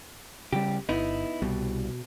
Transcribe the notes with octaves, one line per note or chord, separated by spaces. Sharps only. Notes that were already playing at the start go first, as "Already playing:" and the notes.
C#3 E3 G3 G4
G1 B3 D#4 E4
C2 B2 G3